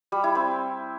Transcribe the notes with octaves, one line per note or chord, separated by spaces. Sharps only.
G3
E4
C4